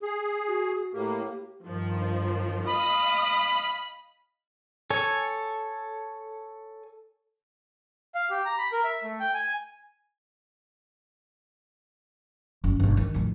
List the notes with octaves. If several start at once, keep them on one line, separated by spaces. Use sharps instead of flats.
G#4
F#4
A2 A#3 G4
G2 D#3 F3
D#5 F5 B5 D#6
A4 C#5 G#5
F5
G4
A#5
B5
A#4
E5
A3
G5
G#5
F#1
G1 B2
D#3
F2 A2